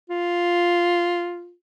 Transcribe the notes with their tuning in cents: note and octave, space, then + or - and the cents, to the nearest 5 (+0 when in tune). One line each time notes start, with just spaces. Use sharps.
F4 +0